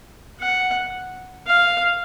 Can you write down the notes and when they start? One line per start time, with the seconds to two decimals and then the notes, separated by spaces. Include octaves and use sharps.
0.40 F#5
1.47 F5